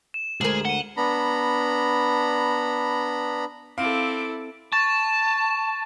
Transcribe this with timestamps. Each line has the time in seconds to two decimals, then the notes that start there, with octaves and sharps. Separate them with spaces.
0.14 E7
0.41 D2 G#3 G#4 A#4 C5 F#7
0.65 F#5 D#7 G7
0.97 B3 D4 A#5 B5
3.78 C4 E4 A4 F5 D6
4.72 A5 C#6 A6